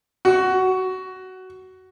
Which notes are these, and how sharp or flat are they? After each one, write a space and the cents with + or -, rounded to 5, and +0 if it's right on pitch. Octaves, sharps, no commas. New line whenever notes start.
F#4 +15